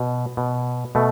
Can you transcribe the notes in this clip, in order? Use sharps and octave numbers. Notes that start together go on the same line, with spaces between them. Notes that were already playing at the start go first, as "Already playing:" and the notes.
Already playing: B2
B2
B2 A3